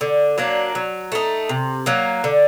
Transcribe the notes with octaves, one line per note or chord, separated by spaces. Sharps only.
D3
F#3 A#3 D4
F#3
A3 D#4
C3
F#3 A#3
D3